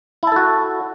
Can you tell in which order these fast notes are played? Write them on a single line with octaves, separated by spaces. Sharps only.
E4 A5 A4 F#4